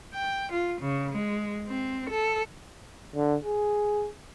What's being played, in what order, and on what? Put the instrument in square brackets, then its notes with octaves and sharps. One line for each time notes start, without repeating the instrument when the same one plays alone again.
[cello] G5
F4
C#3
G#3
C4
A4
[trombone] D3
G#4